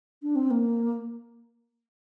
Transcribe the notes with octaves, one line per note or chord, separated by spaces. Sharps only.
D4
C4
A#3